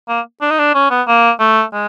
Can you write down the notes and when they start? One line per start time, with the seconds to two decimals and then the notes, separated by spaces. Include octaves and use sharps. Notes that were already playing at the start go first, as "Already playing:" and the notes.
0.09 A#3
0.41 D4
0.50 D#4
0.59 D4
0.75 C#4
0.90 B3
1.08 A#3
1.40 A3
1.73 G#3